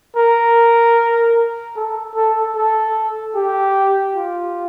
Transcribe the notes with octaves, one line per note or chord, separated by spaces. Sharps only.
A#4
A4
A4
A4
G4
F4